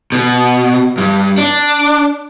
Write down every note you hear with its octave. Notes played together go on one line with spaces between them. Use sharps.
B2
G2
D4